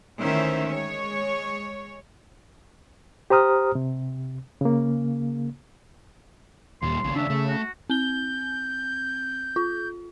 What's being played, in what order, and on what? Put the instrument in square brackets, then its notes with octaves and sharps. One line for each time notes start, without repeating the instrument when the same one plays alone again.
[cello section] D2 D#3 E3 C#4 C5 E5
G#3 C#5
[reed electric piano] G4 C5 A#5 D#6 F6
C3
C#3 A#3
[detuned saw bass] D#2 [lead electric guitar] A#2 G3 [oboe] C6
[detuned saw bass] A#1 [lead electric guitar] D#2 C#3
[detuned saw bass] D4 [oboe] E5
[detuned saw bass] C#3 [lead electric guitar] A3
[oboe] F#4
[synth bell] C4 G7 [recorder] G6
[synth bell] F4